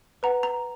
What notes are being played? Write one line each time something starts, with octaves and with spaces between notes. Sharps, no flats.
B4 F#5 A#5
A#5